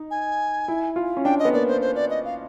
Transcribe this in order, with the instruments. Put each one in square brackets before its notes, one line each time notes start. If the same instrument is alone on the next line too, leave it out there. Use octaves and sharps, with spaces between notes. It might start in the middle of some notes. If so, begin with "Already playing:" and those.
Already playing: [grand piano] D#4
[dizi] G#5
[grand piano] E4
F4
C#4
[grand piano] D4 [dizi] G5
[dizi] D#5
[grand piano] B3
[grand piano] A#3 [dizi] D5
[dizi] C5
C5
D5
D#5
F5